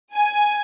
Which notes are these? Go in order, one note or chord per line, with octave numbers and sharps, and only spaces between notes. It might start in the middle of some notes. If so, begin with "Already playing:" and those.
G#5